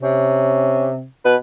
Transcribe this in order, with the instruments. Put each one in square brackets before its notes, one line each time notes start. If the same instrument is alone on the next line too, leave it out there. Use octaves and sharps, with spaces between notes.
[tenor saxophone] C3 [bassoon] C#4
[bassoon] B2 [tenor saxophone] B4